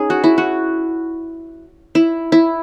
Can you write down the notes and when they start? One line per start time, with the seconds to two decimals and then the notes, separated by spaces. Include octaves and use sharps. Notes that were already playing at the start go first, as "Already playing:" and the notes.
Already playing: C#4 D#4 G#4
0.10 F#4
0.24 E4
0.38 F#4
1.95 E4
2.32 E4